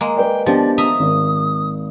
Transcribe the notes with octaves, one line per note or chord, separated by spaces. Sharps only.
G#3 A#3
B4 D5 G5
F3 B3 D4 G4 D5
D#5 E5 A#5 D#6
G#1